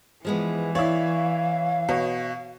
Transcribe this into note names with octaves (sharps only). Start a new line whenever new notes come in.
E3 F3 G#3 B3
E4 C#5 D5 F5
B2 C#5